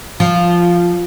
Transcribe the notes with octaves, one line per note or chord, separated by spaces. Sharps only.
F3